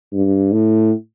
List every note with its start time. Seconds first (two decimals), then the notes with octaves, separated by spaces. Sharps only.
0.13 G2
0.52 A2